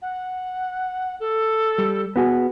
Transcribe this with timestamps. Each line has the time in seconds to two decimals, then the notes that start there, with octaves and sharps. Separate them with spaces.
0.02 F#5
1.20 A4
1.78 G3
2.16 B3 F#4 G#4